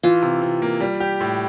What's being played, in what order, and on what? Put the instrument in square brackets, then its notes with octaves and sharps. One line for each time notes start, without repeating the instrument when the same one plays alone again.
[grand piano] E3 [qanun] F4
[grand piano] C3
C3
A#3
G3
G4
A2